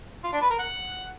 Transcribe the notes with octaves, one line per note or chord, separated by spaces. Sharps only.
F4
D4
B4
A#4
F#5